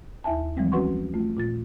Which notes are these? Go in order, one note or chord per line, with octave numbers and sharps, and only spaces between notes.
D#2 E4 E5 G#5 A5
E3 F3 G3 G#3 C4
C#4 F#4 B4 F#5 C6 C#6
A3 F4
A#2 F4 A6